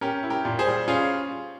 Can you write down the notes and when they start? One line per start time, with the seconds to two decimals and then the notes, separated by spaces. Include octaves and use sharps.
0.01 C#4 G4 A#4
0.23 E4
0.30 G4 A#4
0.45 A#2
0.59 G#4 C5
0.67 G3
0.88 C#4 F4 G#4